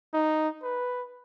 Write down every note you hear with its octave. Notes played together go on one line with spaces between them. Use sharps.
D#4
B4